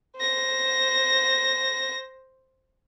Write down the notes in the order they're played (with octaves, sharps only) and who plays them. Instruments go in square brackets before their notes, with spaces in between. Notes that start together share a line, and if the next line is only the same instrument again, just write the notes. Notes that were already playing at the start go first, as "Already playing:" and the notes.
[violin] C5 A#6